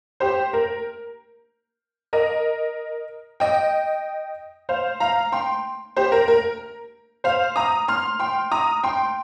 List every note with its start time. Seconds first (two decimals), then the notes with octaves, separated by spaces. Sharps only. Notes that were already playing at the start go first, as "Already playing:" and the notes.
0.20 G4 C5
0.53 A#4
2.13 A#4 D#5
3.40 D#5 G5
4.69 C5 F5
5.00 F5 A#5
5.32 G5 C6
5.96 G4 C5
6.12 A#4
6.28 A#4
7.24 C5 F5
7.56 A#5 D#6
7.88 C6 F6
8.20 G5 C6
8.52 A#5 D#6
8.83 G5 C6